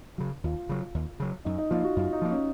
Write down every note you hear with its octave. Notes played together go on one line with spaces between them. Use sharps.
C#3 F#3
D#2 F4
C#3 F#3
D#2
C#3 F#3
F#2 D#4
D#4
F3 A#3 F4
F#4
F#2 F4
D#4
F3 A#3
C#4